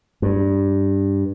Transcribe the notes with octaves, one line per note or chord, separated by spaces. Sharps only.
G2